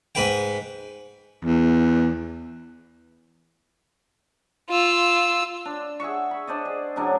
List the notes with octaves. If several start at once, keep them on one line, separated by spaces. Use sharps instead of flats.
G#2 B4 G5
E2
F4 E6
D4
G#4 E5 F#5 C#6
B5
D4 C5 D5 D#5
G#4
A2 C#3 F#3 D4